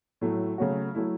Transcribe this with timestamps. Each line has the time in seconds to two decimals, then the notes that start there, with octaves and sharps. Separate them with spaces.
0.21 A2 F#3 A3
0.58 C#3 F#3 A3 C#4 F#4
0.95 F#3 A3 E4